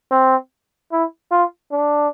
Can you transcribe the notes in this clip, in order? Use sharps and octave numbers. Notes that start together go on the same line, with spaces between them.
C4
E4
F4
D4